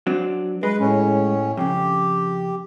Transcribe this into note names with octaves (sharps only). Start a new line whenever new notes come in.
F#3 C4 D4
G#3 B4
A2 C#4
F2 A2 C#3 G4